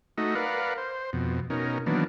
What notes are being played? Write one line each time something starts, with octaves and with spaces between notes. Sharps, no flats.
A3 D#4 F#4 D#5
A#4 B4 D5 F5 F#5
C5
F2 B2
B2 C#4 D#4 A#4
D#3 E3 F#3 A#3 B3 D4